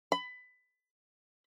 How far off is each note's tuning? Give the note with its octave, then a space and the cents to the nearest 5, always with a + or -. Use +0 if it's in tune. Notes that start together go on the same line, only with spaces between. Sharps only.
B5 +20